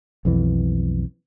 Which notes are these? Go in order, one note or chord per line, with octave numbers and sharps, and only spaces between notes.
B1 F2 E3